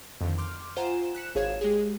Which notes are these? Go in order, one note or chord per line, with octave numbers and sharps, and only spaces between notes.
F2 D3 D#3
C6 D6 F6 G6
F4 C5 F#5 G#5 A#5 E7
F#6 B6 C#7 E7
G#1 G#4 C#5 F5 G#6 E7
G#3 G4 G#4